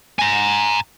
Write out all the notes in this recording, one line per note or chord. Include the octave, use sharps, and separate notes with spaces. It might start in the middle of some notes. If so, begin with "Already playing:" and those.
G#5 A#5